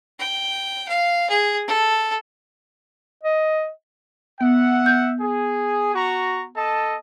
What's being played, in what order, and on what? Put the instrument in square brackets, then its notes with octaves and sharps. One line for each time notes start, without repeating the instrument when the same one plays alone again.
[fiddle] G5
F5
G#4
A4
[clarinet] D#5
[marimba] B3 [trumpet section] E5 F#5
[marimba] B3 G6
[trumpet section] G#4
F#4 A#5 C#6
A4 D#5 A5